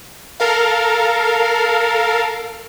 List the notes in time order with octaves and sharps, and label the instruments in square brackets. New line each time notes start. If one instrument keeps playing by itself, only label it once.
[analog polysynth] A4 A#4 F5